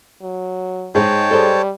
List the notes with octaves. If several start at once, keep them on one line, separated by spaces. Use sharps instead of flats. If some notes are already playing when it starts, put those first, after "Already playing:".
F#3
G#2 D#4 G#4 C5 C#5 G5 A5
G3 A4 C5 D#5